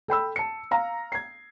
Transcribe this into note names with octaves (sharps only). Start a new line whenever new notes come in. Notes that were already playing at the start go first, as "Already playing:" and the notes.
A4 G5 B5 E6
A5 C#7
F5 A#5
G#6 C7